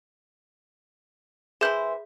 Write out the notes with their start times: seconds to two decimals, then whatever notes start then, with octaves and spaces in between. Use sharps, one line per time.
1.61 E3 G#4 B4 C5 E5 G6